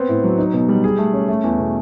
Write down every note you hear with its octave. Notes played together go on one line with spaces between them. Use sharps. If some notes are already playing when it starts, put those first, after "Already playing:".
Already playing: B3 C4
A2
F#3
D#4
B2
G3
G#4
A3
C#4
A3
E2
B2